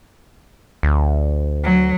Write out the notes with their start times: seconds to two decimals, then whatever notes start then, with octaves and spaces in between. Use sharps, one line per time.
0.83 D2
1.63 F#3